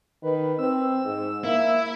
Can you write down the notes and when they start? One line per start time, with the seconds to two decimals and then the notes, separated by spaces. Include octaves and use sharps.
0.23 D#3 B4
0.59 C4 E6
1.05 G#2
1.44 A#3 E4